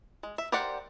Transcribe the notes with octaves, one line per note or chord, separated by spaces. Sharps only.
G#3
E5
G4 A#4 C5 D5 F#5